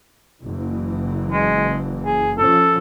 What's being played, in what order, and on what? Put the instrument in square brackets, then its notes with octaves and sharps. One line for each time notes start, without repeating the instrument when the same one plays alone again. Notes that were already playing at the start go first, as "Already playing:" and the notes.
[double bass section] F#1 E3
[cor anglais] G#3
G#4
[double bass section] F3 C#4 [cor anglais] A4